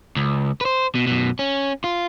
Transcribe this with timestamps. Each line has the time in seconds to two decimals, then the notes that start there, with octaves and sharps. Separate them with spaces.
0.16 C#2
0.61 B4 C5
0.95 B2
1.07 F#2 B2
1.39 C#4
1.84 F4